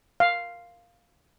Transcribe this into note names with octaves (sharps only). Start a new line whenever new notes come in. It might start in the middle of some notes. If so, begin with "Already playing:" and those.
F5